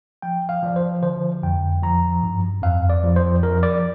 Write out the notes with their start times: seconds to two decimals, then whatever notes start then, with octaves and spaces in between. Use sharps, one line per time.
0.22 F3 G5
0.49 F5
0.62 F3 D5
0.76 C5
1.03 D3 C5
1.43 F2 G5
1.83 F3 A#5
2.23 G2
2.63 F2 F5
2.90 D5
3.03 F3
3.16 C5
3.43 F3 A#4
3.63 D5